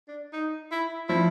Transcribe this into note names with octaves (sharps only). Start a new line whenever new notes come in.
D4
D#4
E4
F3 E4